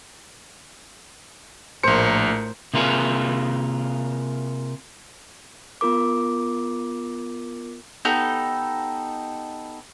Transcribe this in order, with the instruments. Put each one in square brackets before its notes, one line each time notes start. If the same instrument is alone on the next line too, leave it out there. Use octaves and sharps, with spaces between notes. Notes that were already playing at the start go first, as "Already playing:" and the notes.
[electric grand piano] A#1 C#7 [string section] A2 A#4 [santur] C5
[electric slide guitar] C3 A#3 F4 G#4
[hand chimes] B3 F4 A#4 D6
[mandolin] B3 D#4 G4 A4